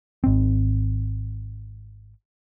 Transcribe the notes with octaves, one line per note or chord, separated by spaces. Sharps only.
G#1 C4